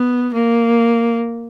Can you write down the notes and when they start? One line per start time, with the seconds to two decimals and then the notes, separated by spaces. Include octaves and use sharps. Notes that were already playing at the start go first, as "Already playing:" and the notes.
Already playing: B3
0.34 A#3